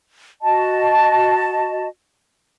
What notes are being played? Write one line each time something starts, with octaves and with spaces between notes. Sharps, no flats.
F#4 D#5 A5